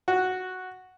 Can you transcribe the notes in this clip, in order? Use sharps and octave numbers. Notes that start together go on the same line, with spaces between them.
F#4